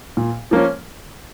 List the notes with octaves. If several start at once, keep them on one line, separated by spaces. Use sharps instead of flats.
A#2
F3 A#3 C#4